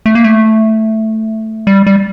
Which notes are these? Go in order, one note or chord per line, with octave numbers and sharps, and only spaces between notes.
A3
A#3
A3
G3
G3